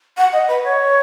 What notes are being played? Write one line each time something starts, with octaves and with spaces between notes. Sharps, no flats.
F#5
D#5
B4
C#5